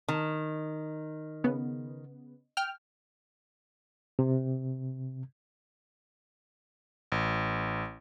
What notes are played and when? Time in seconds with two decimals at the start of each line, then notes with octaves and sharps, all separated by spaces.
0.08 D#3
1.44 C#3 B3
2.57 G5 F6
4.19 C3
7.12 A1